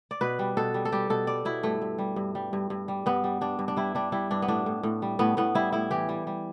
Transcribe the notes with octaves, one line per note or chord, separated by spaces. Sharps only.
D5
B2 B4
G3
B2 A4
G3
A4
G3 G4
B2 A4
G3 D5
B2 E4
G2 A3
G2
G3
G2
G3
G2
G2
G3
G2 B3
G3
G3 D4
G2
D4
G3 E4
G3 D4
G3 E4
G2 D4
B3
A2 D4
A2
A2
G3
A2 B3
A2 B3
G3 E4
A2 E4
E3 G4
G3
G3